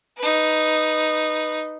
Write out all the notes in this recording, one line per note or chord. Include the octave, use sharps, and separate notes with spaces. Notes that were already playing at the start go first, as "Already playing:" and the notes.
D#4 B4